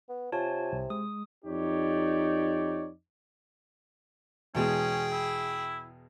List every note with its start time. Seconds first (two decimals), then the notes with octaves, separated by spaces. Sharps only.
0.09 B3
0.32 C3 F4 C#5 G#5 A5
0.73 C2
0.90 G#3 D#6
1.45 F2 D#4 G4 C#5 D5
4.55 E2 B2 G#3 C#4 G#4 G5
5.12 E4